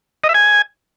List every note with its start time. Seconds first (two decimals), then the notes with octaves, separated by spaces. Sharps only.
0.24 D#5
0.29 E5
0.34 G#5